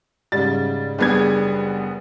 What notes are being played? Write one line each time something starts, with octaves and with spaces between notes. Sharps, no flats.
G#2 C#3 G3 A6
F#1 G3 B3 D4 G#4 G#6